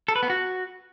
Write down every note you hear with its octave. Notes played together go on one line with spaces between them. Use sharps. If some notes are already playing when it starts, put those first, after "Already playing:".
A4
B4
B3
F#4